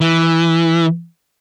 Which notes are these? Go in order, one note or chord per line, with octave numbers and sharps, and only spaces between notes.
E3